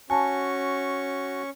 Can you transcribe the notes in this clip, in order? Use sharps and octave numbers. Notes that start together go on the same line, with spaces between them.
C#4 F#4 G#5 A5 C#6